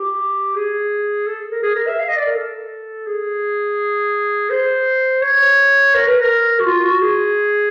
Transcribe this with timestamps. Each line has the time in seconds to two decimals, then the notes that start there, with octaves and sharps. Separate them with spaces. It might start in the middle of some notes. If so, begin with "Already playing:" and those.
Already playing: G4
0.56 G#4
1.27 A4
1.51 A#4
1.63 G#4
1.75 A#4
1.87 E5
1.99 F5
2.08 D#5
2.17 D5
2.26 A#4
2.35 A4
3.07 G#4
4.50 C5
5.22 C#5
5.95 A#4
6.07 B4
6.20 A#4
6.60 F#4
6.66 F4
6.84 F#4
7.01 G#4